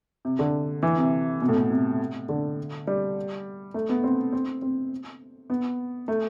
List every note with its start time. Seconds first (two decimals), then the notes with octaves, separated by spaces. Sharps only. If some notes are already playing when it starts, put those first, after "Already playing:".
0.25 C3
0.39 D3
0.83 E3
0.97 C3
1.42 B2
1.49 A2
1.56 B2
1.70 C3
2.29 D3
2.87 G3
3.74 A3
3.89 B3
4.04 C4
4.33 C4
4.62 C4
5.50 B3
6.08 A3